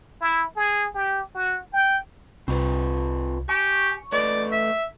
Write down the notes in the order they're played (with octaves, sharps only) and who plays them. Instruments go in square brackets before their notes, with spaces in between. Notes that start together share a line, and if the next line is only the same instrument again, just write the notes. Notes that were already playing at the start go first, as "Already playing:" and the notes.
[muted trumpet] E4
G#4
G4
F#4
G5
[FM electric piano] C2 [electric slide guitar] C4 F4 B4
[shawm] G4 [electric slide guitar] G#5 [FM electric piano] C#6
[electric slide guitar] A3 B4 D#5 [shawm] D5
[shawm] E5